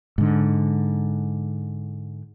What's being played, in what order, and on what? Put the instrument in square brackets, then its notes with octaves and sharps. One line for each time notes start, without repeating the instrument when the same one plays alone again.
[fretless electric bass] G#2 D3